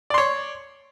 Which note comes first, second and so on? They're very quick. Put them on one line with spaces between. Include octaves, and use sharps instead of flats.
D5 C6 C#5